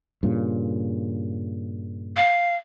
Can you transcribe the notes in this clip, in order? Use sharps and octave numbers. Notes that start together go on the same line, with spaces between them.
G2 A#2 C#3
F5